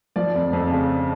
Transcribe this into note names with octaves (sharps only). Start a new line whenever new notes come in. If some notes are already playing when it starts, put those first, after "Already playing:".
F3 D5
F2
F2
C#3